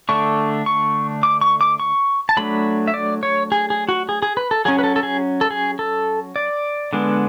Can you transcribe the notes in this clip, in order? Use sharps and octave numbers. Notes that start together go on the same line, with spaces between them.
D3 A3 D4 C#6
C#6
D6
C#6
D6
C#6
A5
F#3 A3 D4 B5
E5
D5
C#5
G#4
G#4
F#4
G#4
G#4
B4
A4
F#3 C#4 G#4
B4
A4
A4
G#4
A4
G#4
A4
D5
D3 G#3 B3 D4